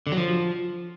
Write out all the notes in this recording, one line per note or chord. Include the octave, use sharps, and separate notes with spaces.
D3
F#3
F3